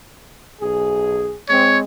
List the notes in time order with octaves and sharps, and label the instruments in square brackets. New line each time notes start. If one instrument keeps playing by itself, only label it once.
[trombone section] B1 G#4
[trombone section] G#3 C4 [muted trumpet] C#5